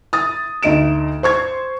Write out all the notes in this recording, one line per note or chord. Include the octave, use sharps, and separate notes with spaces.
D#6 A6
D2 D#4 D#5 D7 E7
C5 C#6 G#6